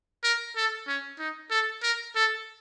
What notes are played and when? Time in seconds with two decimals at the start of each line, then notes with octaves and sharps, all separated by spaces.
0.24 A#4
0.56 A4
0.88 C#4
1.19 D#4
1.51 A4
1.83 A#4
2.15 A4